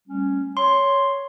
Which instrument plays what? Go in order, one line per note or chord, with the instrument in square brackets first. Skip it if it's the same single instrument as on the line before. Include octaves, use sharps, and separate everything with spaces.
[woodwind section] G3 A3 C#4
[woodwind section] C#5 [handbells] C6